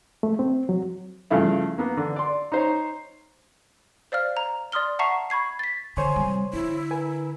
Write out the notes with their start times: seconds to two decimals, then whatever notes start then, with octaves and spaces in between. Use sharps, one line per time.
0.23 A3
0.39 C4
0.69 F#3
1.30 G2 C#3 F3 A3 E4
1.78 A#3 B3
1.97 D3
2.16 D5 C6
2.52 D#4 C5 C#5
4.12 C5 D5 F5 F6
4.37 A#5
4.72 D5 C6 D#6 F6 G7
4.99 E5 F#5 A5 A#5 C#6 C7
5.30 B5 C#6 G#6 C7
5.59 A6 B6
5.97 D3 C5 C#5 G#5 C6
6.16 C3 G3
6.53 D3 E4
6.91 A#4 B4 G#5